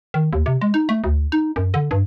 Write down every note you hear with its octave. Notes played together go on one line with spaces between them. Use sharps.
D#3
D#2
C3
G#3
D#4
A3
D2
D#4
F#2
D3
G2